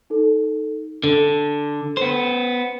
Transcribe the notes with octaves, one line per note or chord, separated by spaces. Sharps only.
D#4 A4
D3 A4
B3 C5